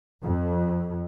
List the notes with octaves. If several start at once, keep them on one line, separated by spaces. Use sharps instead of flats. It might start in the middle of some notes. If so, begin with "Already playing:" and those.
F2